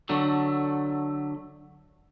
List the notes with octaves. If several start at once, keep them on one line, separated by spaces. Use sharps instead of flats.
D3 F#3 A3